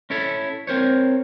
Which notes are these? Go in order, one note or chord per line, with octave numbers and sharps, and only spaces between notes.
C#4 E4 A4 C#5
C4 A#4 C5 C#5